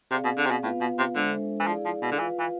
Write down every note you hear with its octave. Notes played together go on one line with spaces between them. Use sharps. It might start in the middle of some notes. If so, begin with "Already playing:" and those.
C3 C4 G#4 D5 F5
B2
D3
C3
B2
A2 B3 F4 B4 F5
B2
C3
D3 G#3 D4 A4 C5 E5
E3
F3 E4 G#4 D5 F5
F3
B2
D3
E3 F4 B4 F5
E3